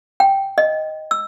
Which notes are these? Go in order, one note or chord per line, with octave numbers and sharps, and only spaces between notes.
G5
D#5
E6